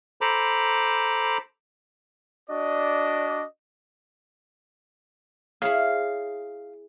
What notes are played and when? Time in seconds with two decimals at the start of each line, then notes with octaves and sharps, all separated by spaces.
0.21 A4 C5 A#5 B5 D6
2.49 D4 F#4 D5 D#5
5.62 E4 G#4 C#5 F5